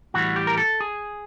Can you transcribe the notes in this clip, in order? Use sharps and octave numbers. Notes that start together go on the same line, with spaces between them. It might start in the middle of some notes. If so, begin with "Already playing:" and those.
A2 E3 G3 F#4
G4
A#4
A4
G#4